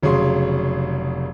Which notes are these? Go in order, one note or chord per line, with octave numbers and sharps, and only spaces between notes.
F1 C#3 F#3 G#4 C#5 C6